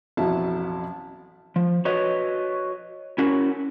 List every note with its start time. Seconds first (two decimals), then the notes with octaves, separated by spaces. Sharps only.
0.17 A1 F2 B2 F#3 E4 A5
1.56 F3
1.85 F#4 B4 C#5 D#5
3.18 C#4 E4 F#4 A#4